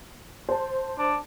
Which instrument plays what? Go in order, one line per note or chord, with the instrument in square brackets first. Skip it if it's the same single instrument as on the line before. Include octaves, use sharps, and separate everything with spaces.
[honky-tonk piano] C5 A5
[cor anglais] D4